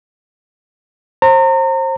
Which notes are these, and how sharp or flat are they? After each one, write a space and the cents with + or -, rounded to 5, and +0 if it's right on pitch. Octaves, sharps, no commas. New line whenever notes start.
C5 +30 A#5 -35